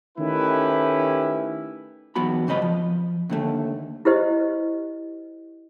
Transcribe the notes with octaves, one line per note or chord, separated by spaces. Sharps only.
D#3 A3 C#4 E4 G4 B4
E2 F#3 B3 F#4 B5
G#2 C#3 C4 D#5 B5
F3
D#2 D3 A3
E4 G4 C5 D#5